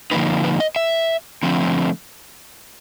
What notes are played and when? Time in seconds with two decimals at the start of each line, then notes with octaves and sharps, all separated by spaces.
0.11 D3 F3 A#3 D#4 B4
0.44 B4
0.60 D#5
0.76 E5
1.43 D3 F3 A3 C4